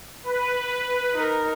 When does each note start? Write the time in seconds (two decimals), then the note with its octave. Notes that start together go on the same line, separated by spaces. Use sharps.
0.23 B4
1.14 D#4 A#4